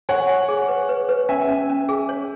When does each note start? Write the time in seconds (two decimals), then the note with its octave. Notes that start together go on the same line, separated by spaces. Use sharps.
0.09 C#5 F#5 G#5
0.29 G#5
0.49 G#4
0.68 B4
0.89 B4
1.09 B4
1.29 C#4 E5 G#5
1.48 C#4
1.70 C#4
1.89 G#4
2.09 C#5